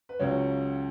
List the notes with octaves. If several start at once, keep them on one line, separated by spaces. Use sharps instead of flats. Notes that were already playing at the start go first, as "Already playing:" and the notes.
B4
C#2 C#3 F#3 C#4 C#5